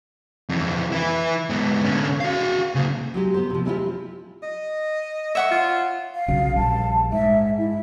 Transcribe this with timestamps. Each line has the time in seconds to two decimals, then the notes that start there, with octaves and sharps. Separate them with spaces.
0.49 F2 E3
0.92 E4 B4
1.50 G#2 B3
1.85 D3 C#4
2.21 F#4 F5
2.75 C#3 A#3
3.14 F#3 G#3 G4
3.34 B3 G4 C5
3.50 C3 F3
3.65 G3 G#3 C4 E4 F4 G4
4.43 D#5
5.35 C#5 E5 F#5 C#6
5.51 F4
6.15 F5
6.28 B1 C#3 F#3
6.56 A#1 G3 A5
7.12 G#2 E5
7.58 E4